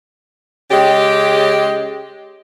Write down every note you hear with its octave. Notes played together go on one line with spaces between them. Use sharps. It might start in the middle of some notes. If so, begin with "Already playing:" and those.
C#3 G#3 G4